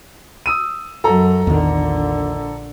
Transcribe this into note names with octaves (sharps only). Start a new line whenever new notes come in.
D#6 E6 D#7
F#2 F#3 A4 A#5
A#1 E2 D3 D#3